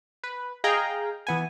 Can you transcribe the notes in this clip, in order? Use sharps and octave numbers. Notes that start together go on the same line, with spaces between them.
B4
G#4 D#5 F5 G5 A#5
E3 B3 G#5